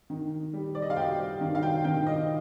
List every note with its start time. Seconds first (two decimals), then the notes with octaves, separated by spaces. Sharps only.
0.10 D#3
0.53 G3
0.75 D5
0.82 D#5
0.90 F5
0.96 G3 G5
1.41 D#3
1.55 F5
1.63 G5
1.84 D#3 G5
2.07 D#5